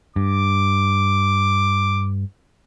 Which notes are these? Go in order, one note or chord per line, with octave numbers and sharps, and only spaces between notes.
G2 D6